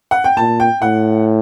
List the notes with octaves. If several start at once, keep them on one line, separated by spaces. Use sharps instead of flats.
F#5
G5
A#2 A5
G5
A2 F#5